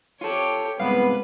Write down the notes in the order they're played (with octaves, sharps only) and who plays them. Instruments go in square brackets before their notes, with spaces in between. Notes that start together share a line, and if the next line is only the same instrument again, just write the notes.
[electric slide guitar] F4 A4 [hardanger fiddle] G4 C#5
[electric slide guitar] G2 C3 G#3 [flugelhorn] B3 [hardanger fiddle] B4 [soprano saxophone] F5